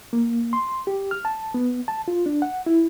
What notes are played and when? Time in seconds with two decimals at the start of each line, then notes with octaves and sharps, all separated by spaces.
0.13 A#3
0.53 C6
0.87 G4
1.11 F6
1.25 A5
1.54 B3
1.88 A5
2.08 F4
2.26 D4
2.42 F#5
2.66 E4